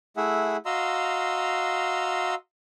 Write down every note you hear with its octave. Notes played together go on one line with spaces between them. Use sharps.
A3 E4 G#4 E5 F#5
F#4 D#5 F5 A#5 C6 E6